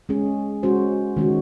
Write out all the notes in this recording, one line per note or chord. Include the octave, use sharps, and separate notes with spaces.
G#3 C#4 G#4
G#3 C#4 F#4 C5
D#3 G#3 C#4 F#4